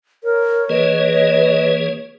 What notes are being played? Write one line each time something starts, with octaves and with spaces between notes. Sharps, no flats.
A#4 C#5
E3 A#3 G#4 B4 D#5